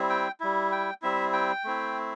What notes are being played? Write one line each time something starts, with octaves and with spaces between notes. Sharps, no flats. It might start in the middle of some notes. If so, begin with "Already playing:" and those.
Already playing: G3 C4 E4
G5
G3 E4
G5
G3 C4 E4 E5
G5
A3 C4 E4